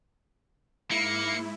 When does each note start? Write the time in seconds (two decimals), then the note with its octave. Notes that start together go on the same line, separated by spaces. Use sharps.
0.91 G#2 A#3 E4 C#7